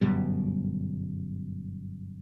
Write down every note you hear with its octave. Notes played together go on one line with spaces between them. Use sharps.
G1 F#2 B2 G3